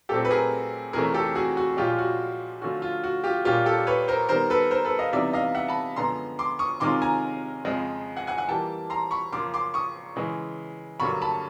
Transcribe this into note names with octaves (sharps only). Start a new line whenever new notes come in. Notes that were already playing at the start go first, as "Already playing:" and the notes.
A#2 F#3 A3 C4 G4 A4
B4
G#4 A#4
F2 C3 E3 A3 C#4 G#4 A#4
G4 A4
F#4 G#4
F#4
A#2 F3 G#3 C#4 F4 G4
F#4
D3 F3 A3 C#4 F4 F#4
F4
F#4
F4 G4
A#2 G3 A#3 C#4 F4 G4
G4 A4
B4 C#5
A#4 C5
D#3 G3 B3 A#4 C5
A4 B4
A#4 C5
A4 B4
D#5 F5
C3 E3 G3 B3 D#4 D5 E5
D#5 F5
E5 F#5
A5 B5
F#2 D3 F3 G#3 B3 A#5 C6
C6 D6
C#6 D#6
C3 D#3 G#3 C#4 F4 C6 D6
G#5 A#5
F2 C#3 F3 G#3
F#5 G#5
F#5 G#5
F#5 G#5
E3 G3 A#3 G5 A5
A#5 C6
B5 C#6
F#2 C#3 F3 A#3 C6 D6
C6 D6
C#6 D#6
C#3 E3 G#3
G2 D3 F#3 A#3 B5 C#6
A5 B5